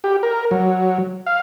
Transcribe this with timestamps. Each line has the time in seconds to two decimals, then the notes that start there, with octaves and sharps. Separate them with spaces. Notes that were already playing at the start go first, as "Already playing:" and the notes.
0.04 G4
0.23 A#4
0.51 F#3
1.26 F5